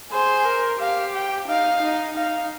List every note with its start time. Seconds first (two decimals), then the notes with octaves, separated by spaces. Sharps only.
0.11 G#4 C5
0.45 A#4
0.80 G4 F5
1.14 G5
1.48 D#4 F5
1.82 D#4
2.17 D#4 F5